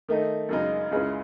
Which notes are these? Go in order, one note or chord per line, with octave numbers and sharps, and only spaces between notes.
D#3 A3 D#4
F#2 C#3 G#3 D#4
C#2 C#3 G#3 C#4 E4